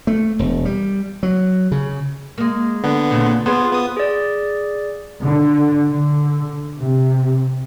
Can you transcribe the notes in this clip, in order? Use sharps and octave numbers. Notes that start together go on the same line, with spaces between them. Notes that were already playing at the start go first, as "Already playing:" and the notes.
A3
E1
G3
F#3
C#3
G#3 A#3
D3 B3
A#2 C#3 C4
B3 F4 G#4 C5
B3 D#6
G#4 D5
D3
D3
C3